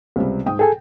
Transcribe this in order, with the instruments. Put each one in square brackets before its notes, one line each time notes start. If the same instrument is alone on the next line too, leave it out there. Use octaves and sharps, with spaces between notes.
[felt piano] C#2 C3 G3
G#2 G5 D#6
[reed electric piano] G#4 A4 G#5 [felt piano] G5